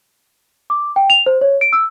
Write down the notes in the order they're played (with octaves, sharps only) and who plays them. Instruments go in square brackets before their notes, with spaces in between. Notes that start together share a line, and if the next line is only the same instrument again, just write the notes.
[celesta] D6
G5
F7
C5
C#5
D7
E6